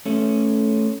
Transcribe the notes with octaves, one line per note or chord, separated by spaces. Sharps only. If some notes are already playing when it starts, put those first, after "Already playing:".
A3 C#4